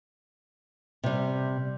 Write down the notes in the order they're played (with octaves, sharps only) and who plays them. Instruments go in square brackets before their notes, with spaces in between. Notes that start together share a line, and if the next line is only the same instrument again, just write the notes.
[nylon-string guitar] C3 G3